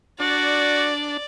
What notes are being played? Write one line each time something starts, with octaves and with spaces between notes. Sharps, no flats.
D4 F#4 D5